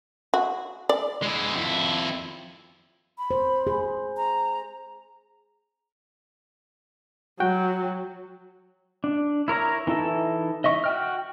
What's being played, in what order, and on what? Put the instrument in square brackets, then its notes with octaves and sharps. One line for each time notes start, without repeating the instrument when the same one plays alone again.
[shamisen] F#4
D5
[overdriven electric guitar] G#3 E4
F2 E4
[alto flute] B5
[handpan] C5
G#4
[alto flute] A#5
[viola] F#3 [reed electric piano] F#4 G5
[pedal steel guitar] D4
E4 A#4 C#5 A#5
E3 D#4 E4 A4
D#5 E5 C#6
F#4 G5 F6